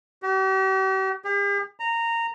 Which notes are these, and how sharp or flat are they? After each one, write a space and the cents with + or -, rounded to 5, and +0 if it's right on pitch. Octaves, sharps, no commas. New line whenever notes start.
G4 -45
G4 +45
A#5 -15